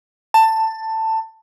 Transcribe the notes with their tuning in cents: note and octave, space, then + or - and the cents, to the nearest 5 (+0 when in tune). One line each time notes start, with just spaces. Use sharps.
A5 +15